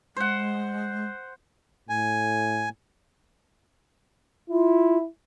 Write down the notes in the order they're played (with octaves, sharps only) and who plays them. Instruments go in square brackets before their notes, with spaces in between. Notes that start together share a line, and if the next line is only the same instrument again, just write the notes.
[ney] G#3 [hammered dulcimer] C5 F#5
[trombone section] A2 [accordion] G#5
[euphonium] E4 [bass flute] F4